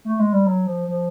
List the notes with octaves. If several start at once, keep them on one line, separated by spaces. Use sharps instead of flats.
A3
G#3
G3
F#3
F3
F3